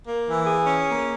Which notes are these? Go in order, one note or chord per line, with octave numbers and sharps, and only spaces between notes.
A#3
E3
G#4
C#4
A#3